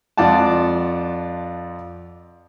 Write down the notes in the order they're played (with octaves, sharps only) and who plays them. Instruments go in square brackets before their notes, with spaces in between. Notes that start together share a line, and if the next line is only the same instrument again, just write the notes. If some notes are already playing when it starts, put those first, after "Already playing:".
[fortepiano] F2 F4 D5 F#5 A5